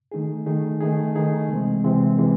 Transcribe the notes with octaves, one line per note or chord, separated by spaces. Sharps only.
D#3 A3 D#4 G#4
D#3 A3 D#4 G#4
D#3 A3 D#4 G#4
D#3 A3 D#4 G#4
C3 E3 G#3 C4
C3 E3 G#3 C4
C3 E3 G#3 C4